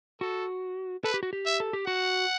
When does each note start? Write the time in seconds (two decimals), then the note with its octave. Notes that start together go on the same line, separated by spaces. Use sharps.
0.21 F#4 A4
1.04 A4 B4
1.14 G4
1.23 F#4
1.33 G4
1.46 E5
1.60 A4
1.73 G4
1.87 F#4 F#5